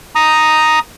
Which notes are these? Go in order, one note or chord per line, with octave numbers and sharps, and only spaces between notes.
A#5 D#6